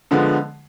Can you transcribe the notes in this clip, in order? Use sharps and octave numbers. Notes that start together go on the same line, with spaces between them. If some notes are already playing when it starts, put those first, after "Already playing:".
D3 F3 G#3 B3